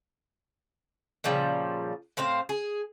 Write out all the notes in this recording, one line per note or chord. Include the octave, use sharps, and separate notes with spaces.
A#2 C#3 F3 G3
A2 C4 C5 F5
G#4